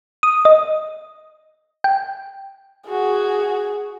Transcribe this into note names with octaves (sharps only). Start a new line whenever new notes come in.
D#6
D#5
G5
F#4 G#4